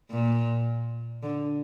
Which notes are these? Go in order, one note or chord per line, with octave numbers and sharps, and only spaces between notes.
A#2
D3